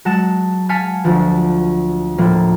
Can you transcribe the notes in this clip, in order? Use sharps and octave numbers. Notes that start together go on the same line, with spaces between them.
F#3 G#3 F#5 A5 E7
F5 G#5 A5 G#6 B6 C#7
D2 F3
A2 F3 A#3